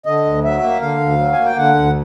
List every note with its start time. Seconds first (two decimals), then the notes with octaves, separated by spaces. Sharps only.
0.06 D3 D#5
0.25 D2
0.44 F#3 E5
0.63 A#3
0.81 D3 F5
1.01 D2
1.19 F#3
1.33 A#3 G#5
1.45 G5
1.56 D3 F#5
1.75 D2